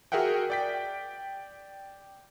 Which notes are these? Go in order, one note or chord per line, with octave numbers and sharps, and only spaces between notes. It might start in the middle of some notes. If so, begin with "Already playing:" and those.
F#4 G#4 A#4 E5 F#5 G5
D5 G5 B6